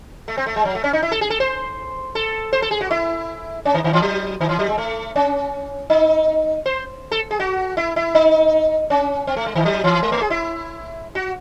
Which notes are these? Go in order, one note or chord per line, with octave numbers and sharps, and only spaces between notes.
A3
C4
A3
G#3
F#3
A3
C#4
D#4
E4
A4
G#4
A4
C5
A4
C5
A4
G#4
F#4
E4
C#4
D#3
D#3
E3
F#3
D#3
E3
F#3
G#3
A3
C#4
D#4
C5
A4
G#4
F#4
E4
E4
D#4
C#4
C4
A3
G#3
D#3
F#3
E3
G#3
A3
G#4
E4
F#4